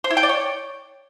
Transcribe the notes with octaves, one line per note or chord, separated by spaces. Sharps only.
C5
E4
G5
D5
C#5